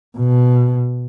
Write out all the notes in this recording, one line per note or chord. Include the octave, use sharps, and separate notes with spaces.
B2